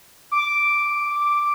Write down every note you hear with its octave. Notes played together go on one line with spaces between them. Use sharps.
D6